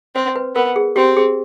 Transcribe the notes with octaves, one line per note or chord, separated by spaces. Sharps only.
C4 C5
B4
B3 A#4
G#4
C4 G4
G#4